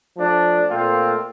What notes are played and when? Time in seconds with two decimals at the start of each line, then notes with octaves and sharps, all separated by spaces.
0.17 F3 A3 D4
0.70 A#2 A3 C4 F4